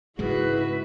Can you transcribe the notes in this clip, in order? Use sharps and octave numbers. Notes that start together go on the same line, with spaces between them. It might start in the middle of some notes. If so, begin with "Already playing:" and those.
G#2 C#3 G#3 E4 F#4 G#4 B4